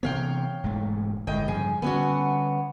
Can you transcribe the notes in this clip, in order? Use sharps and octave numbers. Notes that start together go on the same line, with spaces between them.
C3 E3 B3 C#5 F5 G5
E1 G#2 A3
G1 A2 G#3 D#5 G5
G2 C#3 F3 G#4
D3 G3 B3 C#4 F#4